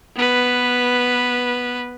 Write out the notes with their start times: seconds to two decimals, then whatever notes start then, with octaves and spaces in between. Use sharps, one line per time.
0.16 B3 B4